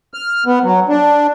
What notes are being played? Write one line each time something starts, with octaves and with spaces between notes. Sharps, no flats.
F6
B3
F#3
D4